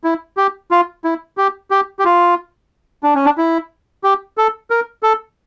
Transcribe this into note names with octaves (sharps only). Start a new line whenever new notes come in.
E4
G4
F4
E4
G4
G4
G4
F4
D4
C#4
D4
E4
G4
A4
A#4
A4